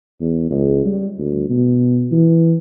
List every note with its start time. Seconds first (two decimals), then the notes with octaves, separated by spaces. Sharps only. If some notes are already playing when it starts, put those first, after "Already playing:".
0.21 E2
0.50 C#2
0.85 G3
1.18 D2
1.50 B2
2.11 E3